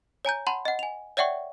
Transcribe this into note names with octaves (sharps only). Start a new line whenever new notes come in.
C#5 G#5 A#5 G6
F#5 A5 B5 C6
D#5 F#5
G#5 F7
C#5 D5 E5 F#5 G5 C#6